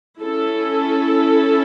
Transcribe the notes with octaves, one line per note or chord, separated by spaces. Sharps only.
C#4 E4 A4